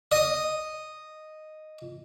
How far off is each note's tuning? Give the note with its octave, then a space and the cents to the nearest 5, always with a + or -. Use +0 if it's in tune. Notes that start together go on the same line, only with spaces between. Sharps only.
D#5 -5